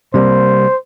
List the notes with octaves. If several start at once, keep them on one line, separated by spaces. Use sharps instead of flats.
C3 G3 A#3 C5